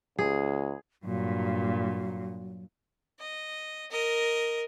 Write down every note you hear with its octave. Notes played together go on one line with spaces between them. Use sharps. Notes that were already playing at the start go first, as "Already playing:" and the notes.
C#2 G#4
G2 A#2 F#3
D#5
A#4 D#5